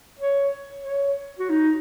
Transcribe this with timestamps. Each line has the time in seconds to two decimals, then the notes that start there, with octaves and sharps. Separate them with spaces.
0.19 C#5
0.85 C#5
1.39 F#4
1.49 D#4